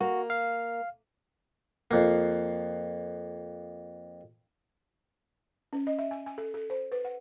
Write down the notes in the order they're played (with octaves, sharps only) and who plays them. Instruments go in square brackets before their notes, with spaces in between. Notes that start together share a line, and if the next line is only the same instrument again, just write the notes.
[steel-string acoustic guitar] A#3 [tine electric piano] F#4
[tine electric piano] F5
[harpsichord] F2 A#3
[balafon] C#4
D#5
E5
G#5
G#5
A4
A4
C5
B4
F#5